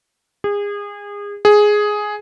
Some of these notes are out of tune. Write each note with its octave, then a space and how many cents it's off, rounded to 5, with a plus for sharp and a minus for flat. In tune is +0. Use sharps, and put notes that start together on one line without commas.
G#4 -30
G#4 +5